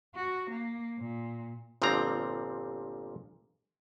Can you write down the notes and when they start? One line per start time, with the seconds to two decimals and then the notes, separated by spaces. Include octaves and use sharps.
0.15 F#4
0.50 A#3
0.99 A#2
1.82 G1 A#2 D3 F3 C4 A#5